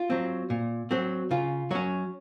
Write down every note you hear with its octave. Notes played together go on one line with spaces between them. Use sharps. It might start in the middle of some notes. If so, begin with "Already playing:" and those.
Already playing: F4
F#3 C4
A#2
F#3 C4
C#3 F4
F#3 C#4 C#5